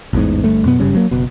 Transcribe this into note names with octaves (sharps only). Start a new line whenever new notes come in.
A1 E2 G#2
G1 G2 A3
F#2 B2 B3
F#1 G2 C#3 G3
F#3 A#3
F#1 B2